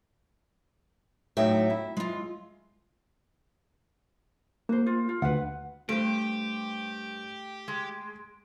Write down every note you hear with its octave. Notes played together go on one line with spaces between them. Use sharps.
A2 F#3 D#4 E5 G5
E4
G#3 F4
A#3 F#4 C5
F4
F4
D2 B4 F#5
G2 A3 G4 C5 D7
G#3